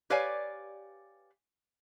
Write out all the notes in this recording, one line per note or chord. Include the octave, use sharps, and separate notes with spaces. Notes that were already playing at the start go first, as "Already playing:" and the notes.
G4 B4 C#5 D5 F5 G#5